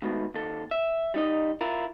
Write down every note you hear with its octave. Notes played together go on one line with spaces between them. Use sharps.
D#2 G#2 B2 A3 B3
D#2 A4
E5
G3 D#4 D#5
E4 F4 A#4